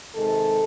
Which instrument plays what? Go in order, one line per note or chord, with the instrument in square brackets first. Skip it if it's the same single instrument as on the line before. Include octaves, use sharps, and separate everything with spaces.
[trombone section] C3 D#3 G#3 A4